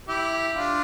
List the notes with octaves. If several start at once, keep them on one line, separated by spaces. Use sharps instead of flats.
E4 G4
D4 F4